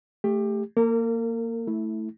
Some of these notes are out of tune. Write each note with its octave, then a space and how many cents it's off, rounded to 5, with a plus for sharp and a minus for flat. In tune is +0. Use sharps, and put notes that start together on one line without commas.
A3 +0 G4 +25
A#3 -10 A#4 -35
A3 +0 E4 -15